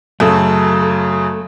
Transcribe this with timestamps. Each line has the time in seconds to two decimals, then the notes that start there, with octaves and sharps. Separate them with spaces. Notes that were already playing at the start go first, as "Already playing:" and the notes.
0.20 F#2 C#3 A3 A4